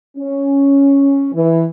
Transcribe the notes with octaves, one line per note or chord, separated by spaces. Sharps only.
C#4
E3